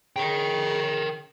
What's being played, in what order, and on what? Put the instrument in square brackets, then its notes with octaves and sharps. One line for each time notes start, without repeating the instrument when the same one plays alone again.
[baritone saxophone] C#3 [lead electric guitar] A#4 G5